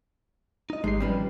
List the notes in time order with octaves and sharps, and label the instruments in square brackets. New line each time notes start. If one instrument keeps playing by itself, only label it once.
[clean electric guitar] D#4 D#5
[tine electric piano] G#1 D#4 C7 [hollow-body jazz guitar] G#3 [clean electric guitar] A3 G4
[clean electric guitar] D#3 F3 [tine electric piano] G3 [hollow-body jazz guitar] C4 C#4 B4